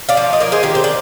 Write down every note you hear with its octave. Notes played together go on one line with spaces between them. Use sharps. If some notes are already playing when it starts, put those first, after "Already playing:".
D5 F5
F3
D#5
A#3 A#4 D5
G#4 C5
D#3 G4 A#4
C5
D5